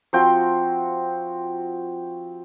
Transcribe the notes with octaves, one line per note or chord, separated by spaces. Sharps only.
F3 C4 F#4 G5